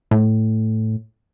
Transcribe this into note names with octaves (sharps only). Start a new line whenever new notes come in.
A2